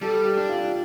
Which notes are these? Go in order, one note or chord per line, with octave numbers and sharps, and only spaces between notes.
G3 A4
G4
D4
F4